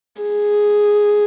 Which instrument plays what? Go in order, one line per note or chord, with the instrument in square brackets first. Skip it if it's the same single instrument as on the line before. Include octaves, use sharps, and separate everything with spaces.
[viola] G#4